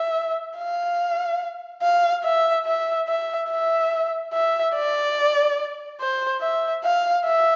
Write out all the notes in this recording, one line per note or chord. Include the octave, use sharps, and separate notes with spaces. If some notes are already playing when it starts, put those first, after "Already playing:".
Already playing: E5
F5
F5
E5
E5
E5
E5
E5
D5
C5
E5
F5
E5